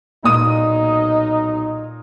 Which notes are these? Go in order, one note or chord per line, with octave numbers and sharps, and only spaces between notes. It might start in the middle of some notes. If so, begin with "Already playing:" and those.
B1 A#2 D#4 D#6